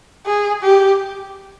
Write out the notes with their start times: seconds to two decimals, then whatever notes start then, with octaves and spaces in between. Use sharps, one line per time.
0.26 G#4
0.63 G4